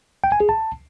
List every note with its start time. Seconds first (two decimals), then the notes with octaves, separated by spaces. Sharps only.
0.24 G5
0.32 G#5
0.40 G#4
0.49 A5